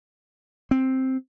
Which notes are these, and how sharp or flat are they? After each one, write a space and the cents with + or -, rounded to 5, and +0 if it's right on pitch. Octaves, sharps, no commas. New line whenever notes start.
C4 +0